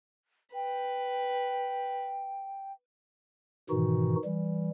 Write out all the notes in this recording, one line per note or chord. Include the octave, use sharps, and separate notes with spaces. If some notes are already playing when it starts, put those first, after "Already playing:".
B4 G5
G#2 B2 D#3 E3 D#4 F#4
E3 G3